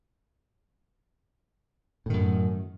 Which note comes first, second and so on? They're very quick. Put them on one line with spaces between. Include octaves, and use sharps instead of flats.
A2 D#3 F#2